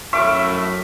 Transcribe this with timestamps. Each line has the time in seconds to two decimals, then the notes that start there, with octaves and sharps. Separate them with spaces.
0.13 F#2 A2 E5 C#6 D6 F6